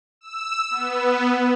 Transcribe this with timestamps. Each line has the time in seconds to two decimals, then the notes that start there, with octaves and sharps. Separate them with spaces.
0.21 E6
0.71 B3